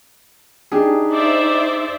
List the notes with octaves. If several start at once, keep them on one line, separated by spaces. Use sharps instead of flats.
D4 D#4 G4 G#4
C5 D5 E5